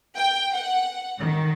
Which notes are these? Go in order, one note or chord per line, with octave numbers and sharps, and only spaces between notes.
G5
F#5
D#3